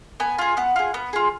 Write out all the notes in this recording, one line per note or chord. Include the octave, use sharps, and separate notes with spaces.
B3 G#5
F4 G#4
B3 F#5
F4 G#4
B3
F4 G#4